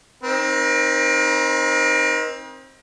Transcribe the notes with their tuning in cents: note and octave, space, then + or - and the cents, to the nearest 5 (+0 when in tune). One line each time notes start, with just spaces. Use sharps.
C4 +25 D#4 +0 A#4 +45